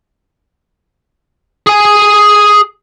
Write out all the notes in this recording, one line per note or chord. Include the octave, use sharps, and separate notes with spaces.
G#4 G#5